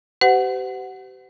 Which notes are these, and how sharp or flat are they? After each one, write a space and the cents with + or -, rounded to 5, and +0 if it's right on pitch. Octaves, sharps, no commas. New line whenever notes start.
G4 -35 C5 -40 F#5 +0